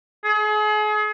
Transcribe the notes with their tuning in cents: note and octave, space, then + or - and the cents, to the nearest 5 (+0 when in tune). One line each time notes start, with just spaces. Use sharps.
G#4 +35